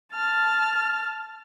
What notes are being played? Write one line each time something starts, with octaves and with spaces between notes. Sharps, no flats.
A5 F6